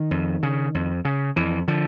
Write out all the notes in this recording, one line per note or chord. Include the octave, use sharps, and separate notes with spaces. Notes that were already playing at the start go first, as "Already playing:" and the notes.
Already playing: D#3
F2
C#3
F2
C#3
F2 E3
D3 F3